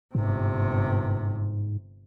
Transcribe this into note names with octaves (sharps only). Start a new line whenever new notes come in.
G1 G#2 C3